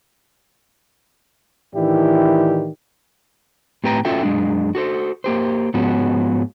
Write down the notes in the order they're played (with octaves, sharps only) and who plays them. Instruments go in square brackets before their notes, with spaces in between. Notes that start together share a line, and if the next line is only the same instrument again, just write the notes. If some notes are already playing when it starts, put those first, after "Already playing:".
[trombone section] A2 D#3 E3 D4 E4 G4
[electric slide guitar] A2 C4 G4 B4 G5 A#5
C#4 F4 F#4 A4 E5 G5
F#2 G#3 D4
F#4 A4 C5
A#3 G4 C5
G#2 F3 B3 C#4 F#4